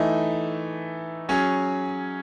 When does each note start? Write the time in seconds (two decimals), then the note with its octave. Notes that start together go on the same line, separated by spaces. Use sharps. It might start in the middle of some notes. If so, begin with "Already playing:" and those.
Already playing: E3 A3 D#4
1.29 F#3 C#4 G#4